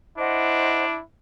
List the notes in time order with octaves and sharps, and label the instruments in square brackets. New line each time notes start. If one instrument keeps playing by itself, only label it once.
[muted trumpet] D4 [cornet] E4 [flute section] C5 D#5 F#5